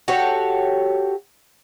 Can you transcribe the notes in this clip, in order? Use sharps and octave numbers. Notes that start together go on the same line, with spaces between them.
F#4 G4 A4 C#5